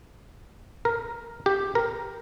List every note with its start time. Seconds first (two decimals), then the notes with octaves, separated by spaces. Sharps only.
0.85 A#4
1.46 G4
1.75 A#4